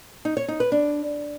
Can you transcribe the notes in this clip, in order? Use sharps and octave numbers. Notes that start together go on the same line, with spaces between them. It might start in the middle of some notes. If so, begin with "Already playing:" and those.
D#4
C#5
D#4
B4
D4